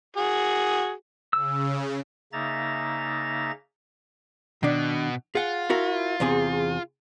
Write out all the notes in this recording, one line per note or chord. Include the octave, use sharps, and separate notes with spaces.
F#4 G#4
C#3 E6
C#3 A#3 D#4 E5 A#5 A6
B2 D#3 D4
F4 G#4 F#5
E4 F#4 A#4
E2 C3 G#4